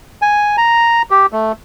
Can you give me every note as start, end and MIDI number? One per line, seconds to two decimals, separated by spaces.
0.22 0.56 80
0.57 1.02 82
1.11 1.26 67
1.32 1.52 57